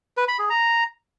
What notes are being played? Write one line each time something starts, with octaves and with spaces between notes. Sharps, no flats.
B4
B5
G#4
A#5